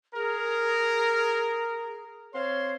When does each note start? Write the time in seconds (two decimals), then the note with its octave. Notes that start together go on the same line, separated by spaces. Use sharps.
0.15 G#4 A#4
2.33 C4 C#5 F5 C6